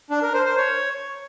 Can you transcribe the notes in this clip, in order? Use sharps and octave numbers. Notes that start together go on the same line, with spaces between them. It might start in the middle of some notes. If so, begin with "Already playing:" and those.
D4
A#4
C5
C5
C#5